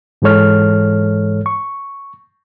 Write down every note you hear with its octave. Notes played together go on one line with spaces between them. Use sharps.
G#2 E3 G#3 A4 C#5 F6
C#6